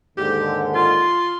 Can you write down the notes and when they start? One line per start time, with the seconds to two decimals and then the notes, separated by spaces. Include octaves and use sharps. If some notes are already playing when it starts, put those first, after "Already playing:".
0.17 D#2 G#2 D3 G4
0.75 F4 C6